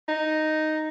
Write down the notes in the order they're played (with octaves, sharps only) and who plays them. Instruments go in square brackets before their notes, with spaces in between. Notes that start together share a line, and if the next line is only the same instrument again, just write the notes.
[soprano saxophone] D#4